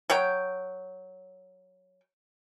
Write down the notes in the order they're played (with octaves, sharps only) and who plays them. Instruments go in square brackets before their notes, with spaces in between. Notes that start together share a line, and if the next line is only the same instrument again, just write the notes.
[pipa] F#3 C#5 G5